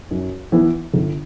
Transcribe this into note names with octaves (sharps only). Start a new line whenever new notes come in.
F#2
E3 B3
G1